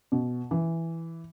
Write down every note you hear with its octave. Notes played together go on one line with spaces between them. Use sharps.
B2
E3